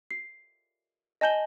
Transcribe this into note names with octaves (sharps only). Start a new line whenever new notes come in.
C7
D#5 G#5 A5 G6 F#7 G7